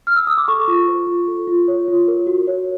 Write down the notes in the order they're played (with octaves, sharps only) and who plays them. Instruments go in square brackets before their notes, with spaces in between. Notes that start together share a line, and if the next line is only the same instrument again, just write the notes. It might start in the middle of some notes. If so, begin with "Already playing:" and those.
[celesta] F6
E6
D#6
D6
A4 C#6
F4
C5
F4
A4
F4
C#5
F4
A#4
F#4
C#5